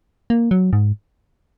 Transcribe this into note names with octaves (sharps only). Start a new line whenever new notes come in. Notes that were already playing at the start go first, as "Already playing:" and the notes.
A#3
F#3
G#2